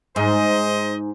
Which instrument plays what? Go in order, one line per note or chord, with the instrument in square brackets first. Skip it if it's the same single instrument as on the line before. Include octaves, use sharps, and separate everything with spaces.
[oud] G#2 [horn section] C5 D#5